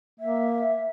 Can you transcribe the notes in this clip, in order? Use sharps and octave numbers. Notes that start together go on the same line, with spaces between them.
A#3 E5